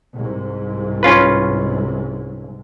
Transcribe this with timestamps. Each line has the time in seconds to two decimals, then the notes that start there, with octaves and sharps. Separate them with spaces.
0.14 C2 G#2
1.03 C#4 F4 B4